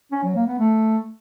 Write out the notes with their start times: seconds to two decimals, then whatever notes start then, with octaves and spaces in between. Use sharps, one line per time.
0.12 C#4
0.23 F#3
0.35 A#3
0.47 B3
0.58 A3